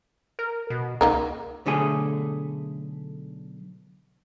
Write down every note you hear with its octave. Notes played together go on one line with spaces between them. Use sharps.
A#4
B2
C#2 A#3 D#4 A#4
B1 D3 A3 G#4